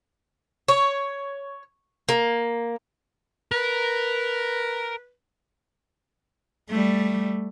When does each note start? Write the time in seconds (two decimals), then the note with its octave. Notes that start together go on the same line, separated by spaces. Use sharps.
0.68 C#5
2.09 A#3
3.52 A#4 B4
6.69 G3 A3